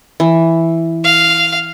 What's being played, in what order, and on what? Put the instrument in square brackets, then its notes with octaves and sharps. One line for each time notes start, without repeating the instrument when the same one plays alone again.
[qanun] E3
[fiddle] F5